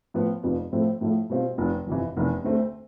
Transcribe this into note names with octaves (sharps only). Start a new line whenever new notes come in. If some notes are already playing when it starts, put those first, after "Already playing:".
A2 F3 B3
F1 F2 C3 F3 B3
A2 F3 A3 C4
A2 F3 A3 E4
B2 G3 C4 F4
F1 E2 C3 F3
G1 F2 C3 E3
F1 E2 C3 E3
D2 D3 A3 C4